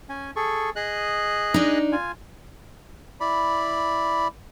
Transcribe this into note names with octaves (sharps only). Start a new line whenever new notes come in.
C#4 G#5
G#4 A4 C#6
G#4 D#5 F#6
D4 D#4
F4 G#5
E4 D5 B5